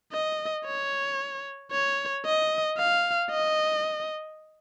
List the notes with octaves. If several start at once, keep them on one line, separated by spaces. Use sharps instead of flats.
D#5
C#5
C#5
D#5
F5
D#5